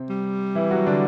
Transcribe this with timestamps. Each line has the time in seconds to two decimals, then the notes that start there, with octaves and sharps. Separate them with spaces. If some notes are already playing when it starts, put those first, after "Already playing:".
Already playing: C3 C4
0.10 G3
0.55 E3 E4
0.71 F#3 F#4
0.87 D3 D4